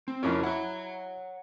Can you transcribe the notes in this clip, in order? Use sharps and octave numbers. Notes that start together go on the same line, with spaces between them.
C4
F2 C#4 E4 F#4 A#4
E4 C#5 F#5